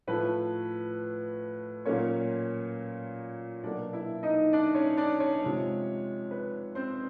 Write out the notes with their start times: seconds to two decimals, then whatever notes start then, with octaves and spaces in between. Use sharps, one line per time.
0.07 A2 F3 A3 B4
1.86 A#2 F#3 A#3 C#4 C#5
3.63 B2 F#3 A#3 D4 D5
3.93 E4 E5
4.23 D#4 D#5
4.53 D4 D5
4.75 C#4 C#5
4.97 D4 D5
5.20 C#4 C#5
5.42 C3 F3 G#3 C#4
6.31 B4
6.75 C4 C5